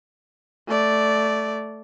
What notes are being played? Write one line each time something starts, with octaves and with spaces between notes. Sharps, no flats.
A3 D5